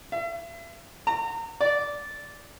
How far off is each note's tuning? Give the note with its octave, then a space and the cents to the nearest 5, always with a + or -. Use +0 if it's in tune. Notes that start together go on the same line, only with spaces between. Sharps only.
E5 +40
A#5 -30
D5 -10